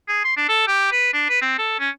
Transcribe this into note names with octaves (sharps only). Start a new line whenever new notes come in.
G#4
C6
D4
A4
G4
B4
D4
B4
C4
A4
C#4